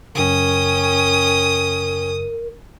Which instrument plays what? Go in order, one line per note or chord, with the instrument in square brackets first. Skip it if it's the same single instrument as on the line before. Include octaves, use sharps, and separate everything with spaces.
[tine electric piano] F#2 C#3 [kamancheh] C#4 G5 [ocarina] A#4 [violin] D#6